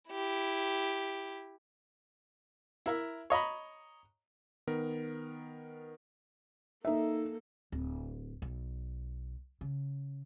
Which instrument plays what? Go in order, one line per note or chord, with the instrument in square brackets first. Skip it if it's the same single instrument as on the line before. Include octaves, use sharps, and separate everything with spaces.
[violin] E4 G4
[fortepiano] E4 A#4 E5
C#5 D#5 A#5 B5
[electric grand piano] D#3 B3 A#4
[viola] A#3 A4 [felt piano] D#4 E5
[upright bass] D1
B1
C#3